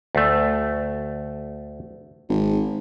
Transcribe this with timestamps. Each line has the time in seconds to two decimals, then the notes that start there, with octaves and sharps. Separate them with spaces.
0.15 D2 A3
2.29 G#1